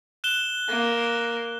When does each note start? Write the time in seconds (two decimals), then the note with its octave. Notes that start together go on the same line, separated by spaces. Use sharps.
0.24 F#6 E7 G7
0.68 A#3